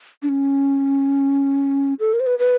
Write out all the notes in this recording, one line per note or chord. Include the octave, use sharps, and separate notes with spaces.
D4
C#4
A4
A#4
C5
B4
B4